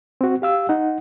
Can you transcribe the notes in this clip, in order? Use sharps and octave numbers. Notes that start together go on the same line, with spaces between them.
C4 F#4
G4 F5 E6
D#4 F#5